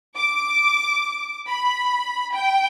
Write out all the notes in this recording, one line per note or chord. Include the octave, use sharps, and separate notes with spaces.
D6
B5
G5